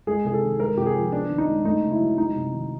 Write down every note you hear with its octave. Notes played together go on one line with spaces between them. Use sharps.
G#3 G#4
C3 G#4
A4
D#3
G#3 A#4
C3 G4
G#4
F3
B3 D4
D#3
D#4
G#3
A3 D#4
C#3
E4
F#3
G#3 D#4
C3
D#3